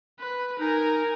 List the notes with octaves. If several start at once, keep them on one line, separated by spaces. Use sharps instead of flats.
B4
D#4 A#4 G#5